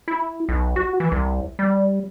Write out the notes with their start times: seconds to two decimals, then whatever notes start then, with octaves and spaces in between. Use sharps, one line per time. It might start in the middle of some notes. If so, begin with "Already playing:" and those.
0.08 E4
0.49 B1
0.76 F#4
1.00 E3
1.12 C2
1.59 G3